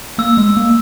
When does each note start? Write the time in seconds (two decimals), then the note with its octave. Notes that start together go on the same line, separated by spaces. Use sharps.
0.18 A#3 E6
0.37 G#3
0.57 A#3